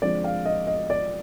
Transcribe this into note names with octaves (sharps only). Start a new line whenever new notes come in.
D3 F3 G#3 C4 D5
F5
D#5
D#5
D5